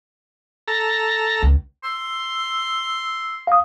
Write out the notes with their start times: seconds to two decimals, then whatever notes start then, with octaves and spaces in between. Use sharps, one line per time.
0.68 A4 A#5
1.42 C#2
1.84 C6 E6
3.47 F5 D#6